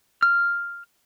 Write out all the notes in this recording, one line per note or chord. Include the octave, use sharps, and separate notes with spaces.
F6